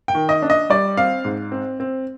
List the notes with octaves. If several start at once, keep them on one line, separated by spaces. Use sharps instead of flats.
G5
D#3
D#5
D4
D#5
G3 D5
C4 F5
G#2
C4
C4